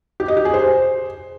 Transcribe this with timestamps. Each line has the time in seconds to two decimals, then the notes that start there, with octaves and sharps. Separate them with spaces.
0.20 G4
0.28 D#5
0.37 G4
0.45 G#4
0.54 C5